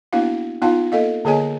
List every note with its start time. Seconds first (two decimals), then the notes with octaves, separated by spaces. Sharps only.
0.13 A#3 B3 D4 E4 F#4 F5
0.62 B3 D#4 F4 F5 A5
0.92 A#3 A4 D#5 F5
1.25 D3 A#3 G#4 C#5 D#5 G#5